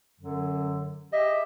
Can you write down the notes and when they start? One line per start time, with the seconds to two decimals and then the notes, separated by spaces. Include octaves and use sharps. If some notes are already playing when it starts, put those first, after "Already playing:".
0.20 F#2 D3 F#3
1.13 G4 G#4 D#5 E5